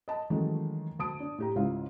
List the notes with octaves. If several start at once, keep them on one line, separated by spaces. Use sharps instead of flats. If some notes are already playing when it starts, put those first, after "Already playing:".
D#5 A5
D#3 E3 F#3 G#3 A3 C#4
D2 A5 D#6 D7
D4
A2 G4 A#5
C#2 G#2 C#3 E4 F4 F5